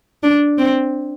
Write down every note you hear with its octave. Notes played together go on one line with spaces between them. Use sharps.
D4
C4